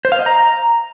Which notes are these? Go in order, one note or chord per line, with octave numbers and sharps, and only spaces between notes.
C5
F5
D#5
A#5